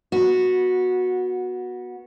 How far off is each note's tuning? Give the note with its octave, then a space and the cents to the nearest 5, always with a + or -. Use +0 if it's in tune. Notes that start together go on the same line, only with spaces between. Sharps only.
B3 -25 F#4 -10